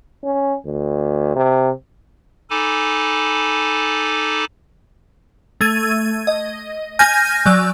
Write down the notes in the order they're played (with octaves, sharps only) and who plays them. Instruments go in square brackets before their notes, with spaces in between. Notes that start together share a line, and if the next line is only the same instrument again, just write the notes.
[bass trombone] C#4
D2
C3
[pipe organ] D#4 A4 G#5 A5 B5 D6
[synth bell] A3 G#6 D#7
D#5
G#5 F6 G6 A#6 D#7
F#3 D5 E6